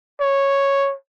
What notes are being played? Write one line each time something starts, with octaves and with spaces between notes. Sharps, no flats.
C#5